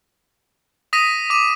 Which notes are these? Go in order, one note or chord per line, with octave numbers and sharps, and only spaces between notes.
D#6 A#6 B6 D#7
D6 D#7